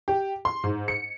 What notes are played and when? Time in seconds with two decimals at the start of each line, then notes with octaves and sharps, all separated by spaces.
0.08 G4
0.45 C6
0.64 G#2
0.88 C#7